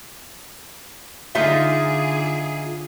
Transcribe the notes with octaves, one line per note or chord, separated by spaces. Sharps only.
D3 D#4 F4 G#4 E5